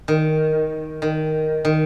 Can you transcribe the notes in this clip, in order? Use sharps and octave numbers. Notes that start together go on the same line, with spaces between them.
D#3
D#3
D#3